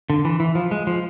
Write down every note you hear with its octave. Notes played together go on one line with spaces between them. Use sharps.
D3
E3
E3
F3
G#3
F3